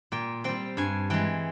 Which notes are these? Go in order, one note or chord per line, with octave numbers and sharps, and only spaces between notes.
A#2 G5
G3 C4 G5
G2 G#5
E3 G#3 G5